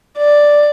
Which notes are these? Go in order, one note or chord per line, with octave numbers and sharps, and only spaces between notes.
D5